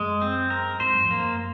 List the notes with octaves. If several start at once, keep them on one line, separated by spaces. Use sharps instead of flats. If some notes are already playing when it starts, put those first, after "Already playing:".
Already playing: F#2 G#3
C4
A#4
G#2 C5
F#2
F2
A#3
F#2